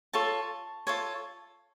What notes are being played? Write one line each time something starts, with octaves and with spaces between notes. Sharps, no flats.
F4 A4 C#5 A5 C#6
F4 A4 C#5